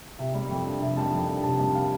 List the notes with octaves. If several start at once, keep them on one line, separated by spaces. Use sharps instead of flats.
C3 E5
G3
F2
D4
C3 E5
G3 A5
F2 A5
D4
C3 A5
G3 A5
F5